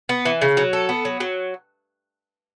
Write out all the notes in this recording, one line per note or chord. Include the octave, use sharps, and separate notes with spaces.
B3
E3
C#3
F#3
A4
B3
F#3
F#3